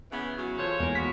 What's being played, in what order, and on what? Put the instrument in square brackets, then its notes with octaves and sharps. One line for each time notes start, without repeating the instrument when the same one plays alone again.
[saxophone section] C#3 E3 B3
C#3 F#3
[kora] E3 F4 A4 [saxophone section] C5 C#5
[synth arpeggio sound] E2 [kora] G#3 A#3 A#4
[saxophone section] G#2 F#4 [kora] B3 A#4 [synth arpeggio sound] B6